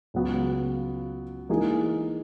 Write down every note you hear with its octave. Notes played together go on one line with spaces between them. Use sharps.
C#2 C#3 F#3 B3
E3 A#3 D#4 G#4